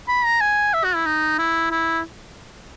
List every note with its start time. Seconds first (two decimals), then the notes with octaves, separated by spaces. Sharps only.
0.08 B5
0.25 A#5
0.41 G#5
0.74 E5
0.84 F#4
0.95 E4
1.06 D#4
1.39 E4
1.71 E4